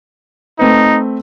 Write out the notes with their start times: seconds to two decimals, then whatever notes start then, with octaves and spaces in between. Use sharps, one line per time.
0.59 A3 C4 D#4 B4